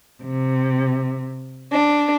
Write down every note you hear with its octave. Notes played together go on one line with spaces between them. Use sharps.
C3
D4